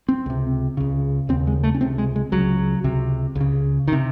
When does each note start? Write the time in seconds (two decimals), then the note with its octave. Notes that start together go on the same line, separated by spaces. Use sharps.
0.09 C4
0.26 C#2 C3
0.77 C#2 C#3
1.29 D#2 C#3 C4
1.47 G#3
1.63 A3
1.74 C#4
1.81 C#2 C3 C4
1.98 G#3
2.16 G#3
2.32 C#2 C#3 F#3
2.84 C#2 C3
3.35 C#2 C#3
3.88 D#3
3.92 C3